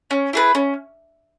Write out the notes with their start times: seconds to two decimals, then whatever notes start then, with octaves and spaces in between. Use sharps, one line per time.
0.11 C#4
0.33 E4 G#4 B4
0.55 C#4